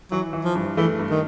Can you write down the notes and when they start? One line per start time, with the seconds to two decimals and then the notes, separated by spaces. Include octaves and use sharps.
0.11 E3 F#3
0.33 E3
0.44 F3
0.55 G2
0.77 E3 A3
1.00 G2
1.10 D#3